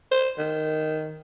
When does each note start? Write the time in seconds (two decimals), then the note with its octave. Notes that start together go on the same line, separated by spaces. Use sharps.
0.12 C5
0.38 D#3